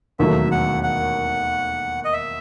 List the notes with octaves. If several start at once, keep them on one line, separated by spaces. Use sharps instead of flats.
E1 D#2 D#3 F#3 A3 E5
F#5
F#5
D#5
E5